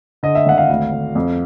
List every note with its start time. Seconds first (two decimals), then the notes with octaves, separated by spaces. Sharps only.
0.23 D3 D#5
0.35 E5
0.46 G#1 F#5
0.58 F5
0.69 D2
0.92 D2
1.15 F2